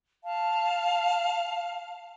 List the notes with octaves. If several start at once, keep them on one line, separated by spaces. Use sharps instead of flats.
F5 A5